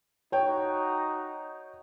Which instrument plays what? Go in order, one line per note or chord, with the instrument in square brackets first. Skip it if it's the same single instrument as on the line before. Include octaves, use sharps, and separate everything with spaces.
[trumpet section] D#4 F#4 [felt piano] C#5 G5